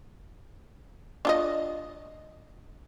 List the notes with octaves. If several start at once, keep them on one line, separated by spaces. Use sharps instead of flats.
D4 F4 D#5